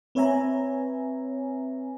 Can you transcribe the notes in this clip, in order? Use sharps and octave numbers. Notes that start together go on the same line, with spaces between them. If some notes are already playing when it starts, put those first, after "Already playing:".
C4 B4 C#5 E5 G#5 A#5